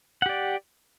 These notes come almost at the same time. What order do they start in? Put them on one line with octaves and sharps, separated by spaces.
F#5 G4 D5